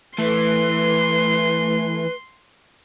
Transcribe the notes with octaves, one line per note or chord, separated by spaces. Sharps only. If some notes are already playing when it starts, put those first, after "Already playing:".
E3 A3 B4 C6